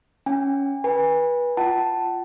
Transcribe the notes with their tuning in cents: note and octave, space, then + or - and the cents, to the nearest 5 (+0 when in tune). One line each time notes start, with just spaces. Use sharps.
C#4 +0 G#5 -35
B4 -25 G#5 -30
F4 +0 F#5 +40 A5 +0